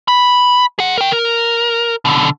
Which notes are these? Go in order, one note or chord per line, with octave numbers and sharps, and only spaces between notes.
B5
G#4 F#5
A#4 G5
A#4
B2 D3